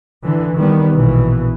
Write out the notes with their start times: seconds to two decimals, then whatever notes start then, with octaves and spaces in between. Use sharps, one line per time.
0.23 D3 E3
0.56 D#3 G3 B3
0.94 A#1 B2 E3